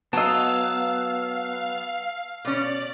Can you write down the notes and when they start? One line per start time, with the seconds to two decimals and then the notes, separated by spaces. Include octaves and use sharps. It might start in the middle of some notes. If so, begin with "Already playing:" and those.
0.13 F#3 B3 D#5 F5 A5 E6
2.45 B2 C#4 D5